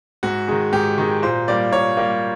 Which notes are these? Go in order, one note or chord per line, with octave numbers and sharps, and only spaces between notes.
G#2 F#4
D#3 G#3
G#2 G4
D#3 G#3
A#2 C5
G3 A#3 D5
A#2 C#5
G3 A#3